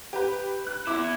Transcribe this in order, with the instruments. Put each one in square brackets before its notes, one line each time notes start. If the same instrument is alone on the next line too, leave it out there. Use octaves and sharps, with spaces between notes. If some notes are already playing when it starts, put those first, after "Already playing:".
[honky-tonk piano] G4 B4
F#6
[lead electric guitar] E2 E4 [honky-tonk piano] D6